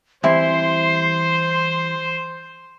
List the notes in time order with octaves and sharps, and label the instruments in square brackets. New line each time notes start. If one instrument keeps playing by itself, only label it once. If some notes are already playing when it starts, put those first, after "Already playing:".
[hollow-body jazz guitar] E3 G3 C4 [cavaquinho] E4 [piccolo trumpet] C5 [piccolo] C6